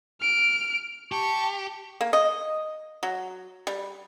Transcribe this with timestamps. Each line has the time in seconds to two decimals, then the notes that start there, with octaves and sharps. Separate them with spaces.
0.21 F6 D7
1.12 G4 A5 C#6
2.01 A#3
2.13 D#5
3.03 F#3
3.67 G3